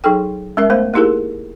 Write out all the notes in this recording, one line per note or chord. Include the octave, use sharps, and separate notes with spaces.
F#3 D#4 G#4 A4 G5
G#3 C#4 A#4 E5
A3 B3 C5
A#3 D#4 E4 G4 G#4 A#4